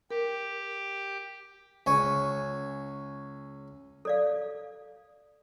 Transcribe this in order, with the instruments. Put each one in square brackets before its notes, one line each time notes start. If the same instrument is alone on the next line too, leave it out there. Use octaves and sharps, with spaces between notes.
[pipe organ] G4 [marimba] A#4
[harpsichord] C#2 C#5 G#5 C#6
[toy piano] A4 D5 F5